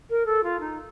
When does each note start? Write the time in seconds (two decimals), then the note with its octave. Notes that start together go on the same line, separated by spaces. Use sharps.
0.10 A#4
0.26 A4
0.43 F4
0.60 D#4